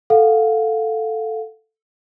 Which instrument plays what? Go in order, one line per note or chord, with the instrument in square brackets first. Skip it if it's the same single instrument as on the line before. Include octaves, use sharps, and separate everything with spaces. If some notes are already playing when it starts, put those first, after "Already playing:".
[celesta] A4 F5 F#5